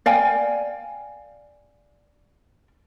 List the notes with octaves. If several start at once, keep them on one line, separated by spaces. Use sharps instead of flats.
D5 F5 G5 G#5